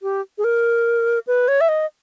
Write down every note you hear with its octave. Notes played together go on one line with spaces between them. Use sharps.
G4
G#4
A#4
B4
C#5
E5
D#5